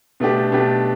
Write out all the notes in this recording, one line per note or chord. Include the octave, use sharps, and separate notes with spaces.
B2 A3 D4 G4
B2 A3 D4 G4